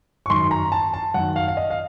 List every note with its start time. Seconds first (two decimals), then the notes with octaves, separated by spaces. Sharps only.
0.26 C#6
0.30 F#2 D#3 C6
0.51 A#5
0.72 A5
0.94 A5
1.14 F#2 D#3 F#5
1.36 F5
1.48 F5
1.57 D#5
1.70 F5